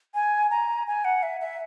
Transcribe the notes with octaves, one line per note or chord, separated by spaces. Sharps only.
G#5
A#5
G#5
F#5
E5
E5